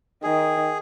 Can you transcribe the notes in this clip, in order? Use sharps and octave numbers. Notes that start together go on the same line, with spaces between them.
D#3 G#4